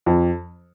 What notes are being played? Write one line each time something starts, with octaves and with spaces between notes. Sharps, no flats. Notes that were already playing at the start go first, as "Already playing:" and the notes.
F2